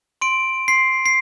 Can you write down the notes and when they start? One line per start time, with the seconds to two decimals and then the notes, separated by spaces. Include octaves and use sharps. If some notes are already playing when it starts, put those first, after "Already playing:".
0.21 C6 D7
0.68 C6 C7
1.06 C7